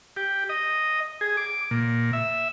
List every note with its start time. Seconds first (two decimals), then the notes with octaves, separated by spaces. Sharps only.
0.17 G4
0.49 D#5
1.21 G#4
1.37 D6
1.71 A#2
2.13 E5